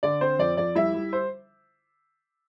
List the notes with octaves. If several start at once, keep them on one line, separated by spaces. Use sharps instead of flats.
D3 D5
C4 C5
F2 D5
F2 D5
G3 E4 E5
G3
C5